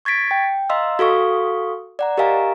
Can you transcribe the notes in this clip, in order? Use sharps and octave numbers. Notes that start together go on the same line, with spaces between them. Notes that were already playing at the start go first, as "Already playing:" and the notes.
C#6 G#6 A6 B6 D7
G5
D#5 F5 A#5 C6 E6
F#4 A4 F5 C#6 D#6
D5 F#5 A#5
G4 A#4 D#5 F5 G#5 A#5